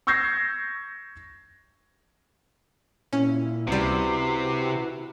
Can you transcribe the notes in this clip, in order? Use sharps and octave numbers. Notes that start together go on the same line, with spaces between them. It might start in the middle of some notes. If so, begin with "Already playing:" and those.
C#6 E6 G6 G#6 A#6 C7
A#2 C#4 E4
C#2 C3 G3 E4 F#4 B4